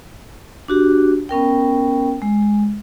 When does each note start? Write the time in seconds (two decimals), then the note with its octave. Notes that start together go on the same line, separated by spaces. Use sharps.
0.68 D4 F#4 G4
1.29 B3 C#4 A#4 G5
2.22 G#3